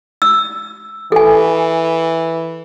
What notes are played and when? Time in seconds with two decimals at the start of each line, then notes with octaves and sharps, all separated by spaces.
0.22 E6
1.12 E3 A4 G#5